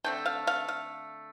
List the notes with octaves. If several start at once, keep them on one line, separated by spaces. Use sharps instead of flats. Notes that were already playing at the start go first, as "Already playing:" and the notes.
D3 A3 C4 G5
F5
F5
F5